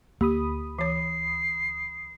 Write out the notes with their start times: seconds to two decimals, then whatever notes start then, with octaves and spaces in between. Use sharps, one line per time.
0.21 D2 A#3 G4 B5 D#6
0.79 E3 C#5 C7